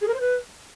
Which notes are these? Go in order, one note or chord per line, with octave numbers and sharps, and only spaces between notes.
G#4
A#4
C5
B4